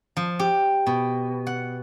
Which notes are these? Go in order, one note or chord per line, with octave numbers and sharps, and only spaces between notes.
F3
G4
B2
F#5